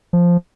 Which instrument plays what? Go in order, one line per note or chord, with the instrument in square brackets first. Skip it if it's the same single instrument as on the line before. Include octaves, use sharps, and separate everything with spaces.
[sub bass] F3